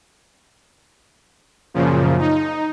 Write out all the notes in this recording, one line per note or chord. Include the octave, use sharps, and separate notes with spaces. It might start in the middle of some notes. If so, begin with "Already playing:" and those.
F#2 A#2 C#3 F3
D#4